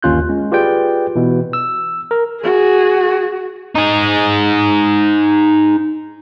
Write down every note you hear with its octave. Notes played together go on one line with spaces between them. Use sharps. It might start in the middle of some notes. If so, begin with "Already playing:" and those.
G1 D#2 C#4 F4 F#6 G6
G#3 C#4
F4 G4 G#4 B4 D5 G5
B2 E3
E6
A#4
F#4 G#4
D#4 G#4